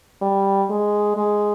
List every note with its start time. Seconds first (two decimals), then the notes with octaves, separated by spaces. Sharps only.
0.22 G3
0.70 G#3
1.17 G#3